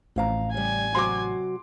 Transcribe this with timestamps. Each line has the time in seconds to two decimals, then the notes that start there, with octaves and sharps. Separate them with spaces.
0.16 A1 F2 F5 A#5
0.54 C#3 G3 G#5
0.95 C3 F#3 F#4 C6 D6